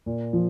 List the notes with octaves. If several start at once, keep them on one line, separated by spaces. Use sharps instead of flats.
A#2
F3